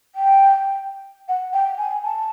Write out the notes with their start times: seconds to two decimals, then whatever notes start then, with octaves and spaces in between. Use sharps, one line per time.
0.15 G5
1.28 F#5
1.53 G5
1.78 G#5
2.03 A5